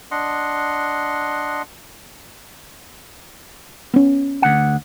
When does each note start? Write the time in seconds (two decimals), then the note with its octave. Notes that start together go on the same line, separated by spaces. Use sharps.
0.11 D4 D#5 F#5 C6
3.94 B3 C#4
4.42 D2 F#5